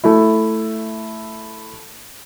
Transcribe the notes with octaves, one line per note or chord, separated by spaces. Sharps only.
A3 E4